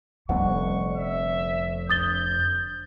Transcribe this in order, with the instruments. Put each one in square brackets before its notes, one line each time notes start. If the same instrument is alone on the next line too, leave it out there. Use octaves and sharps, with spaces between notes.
[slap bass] F1 F2 D3 [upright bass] G3 B3 [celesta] F#5 [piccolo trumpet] C#6
[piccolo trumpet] E5
[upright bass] D4 [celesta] D#6 A6 G7 [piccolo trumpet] G6